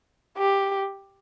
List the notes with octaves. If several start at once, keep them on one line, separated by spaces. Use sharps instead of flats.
G4